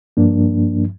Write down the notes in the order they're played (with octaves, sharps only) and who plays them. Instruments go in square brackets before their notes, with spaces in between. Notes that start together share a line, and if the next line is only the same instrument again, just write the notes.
[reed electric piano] G2 F3 A#3 D4